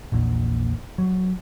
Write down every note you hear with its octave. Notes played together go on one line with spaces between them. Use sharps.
A#1 E2 A#2
F#3